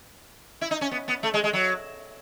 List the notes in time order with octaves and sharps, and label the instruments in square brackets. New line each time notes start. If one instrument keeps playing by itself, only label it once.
[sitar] E4
D#4
C#4
B3
B3
A3
G#3
G#3
F#3